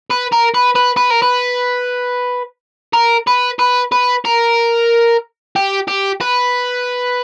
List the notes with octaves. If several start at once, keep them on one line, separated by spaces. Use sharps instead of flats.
B4
A#4
B4
B4
B4
A#4
B4
A#4
B4
B4
B4
A#4
G4
G4
B4